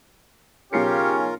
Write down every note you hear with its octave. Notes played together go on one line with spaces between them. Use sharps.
B1 C#3 C#4 F4 G4 A#4 C7 C#7